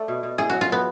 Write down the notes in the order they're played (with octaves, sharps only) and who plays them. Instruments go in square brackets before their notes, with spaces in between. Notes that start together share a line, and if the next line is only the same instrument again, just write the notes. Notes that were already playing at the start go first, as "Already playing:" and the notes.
Already playing: [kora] A3 D4 [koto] A4
[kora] B2
B2
[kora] A2 [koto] G#4
[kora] F#3 [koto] F#4
[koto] F4
[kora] F#3 [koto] B3